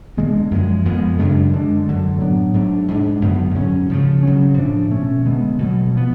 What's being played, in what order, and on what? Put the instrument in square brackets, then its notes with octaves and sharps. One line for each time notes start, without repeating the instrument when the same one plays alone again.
[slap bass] D3 F3 G#3 B3
F#2 F3 G#3
F2 F3 G#3 B3
F#2 C#3 G#3 D4
D3 G#3 D4
F#2 D3 F#3 A3
A2 F#3 B3 D4
G#2 F#3 A3 D4
G#2 G#3 D4
F#2 D3 F#3 B3
G#2 F#3 C#4
C#3 F3 A3
C#3 F#3 C#4
A2 F3 A3 D4
B2 A3 C#4
D3 G#3 B3
B2 F#3 A3
F3 B3